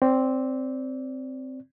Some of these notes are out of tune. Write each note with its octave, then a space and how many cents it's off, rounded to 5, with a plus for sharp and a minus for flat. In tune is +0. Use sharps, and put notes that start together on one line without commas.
C4 +0 D5 -25